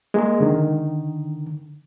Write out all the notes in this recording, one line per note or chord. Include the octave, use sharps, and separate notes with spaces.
G#3 A#3
D3 D#3